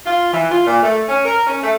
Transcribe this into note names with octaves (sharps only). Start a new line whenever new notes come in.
F4
E3
F4
A#2
A3
C#4
A#4
C#4
A3